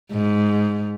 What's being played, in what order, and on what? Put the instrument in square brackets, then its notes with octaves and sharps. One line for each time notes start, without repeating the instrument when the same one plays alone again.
[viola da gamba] G#2